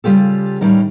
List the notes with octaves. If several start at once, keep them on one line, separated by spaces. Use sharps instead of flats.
C#3 G3 F4 G4 A4
A2 D#3 G3 C#4 D#4